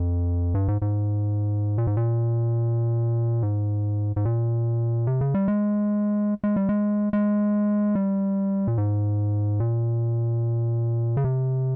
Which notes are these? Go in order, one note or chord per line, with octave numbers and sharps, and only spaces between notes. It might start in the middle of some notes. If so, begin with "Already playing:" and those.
Already playing: F2
G2
G#2
G#2
A#2
G#2
A#2
G#2
G#2
A#2
C3
C#3
G3
G#3
G#3
G3
G#3
G#3
G3
A#2
G#2
A#2
C#3
C3